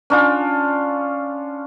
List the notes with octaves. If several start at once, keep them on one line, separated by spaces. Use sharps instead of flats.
C#4 D4 F4